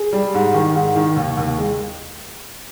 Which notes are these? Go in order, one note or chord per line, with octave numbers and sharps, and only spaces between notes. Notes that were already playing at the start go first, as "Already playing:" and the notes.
Already playing: G#4
G3
G#2
D#3
G#2
D#3
D#2
D#2
G#3